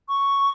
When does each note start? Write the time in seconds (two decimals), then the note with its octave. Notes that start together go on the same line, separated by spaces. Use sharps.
0.09 C#6